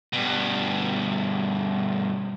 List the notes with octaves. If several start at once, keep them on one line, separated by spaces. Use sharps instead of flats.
G2 B2